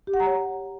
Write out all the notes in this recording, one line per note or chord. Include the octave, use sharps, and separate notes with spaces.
G4
F#5
A#5
C#5